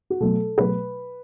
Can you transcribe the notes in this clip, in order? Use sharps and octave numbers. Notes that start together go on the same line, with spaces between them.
F#4
B2 F#3 A3 A4
B2 F#3 A3 B4